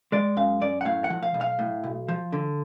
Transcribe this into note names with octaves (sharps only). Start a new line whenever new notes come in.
G#3 D5
F#2 F5
F#2 D5
F#5
A2 F5
F#5
F3
F5
B1
F5
A2
B1
F3
D3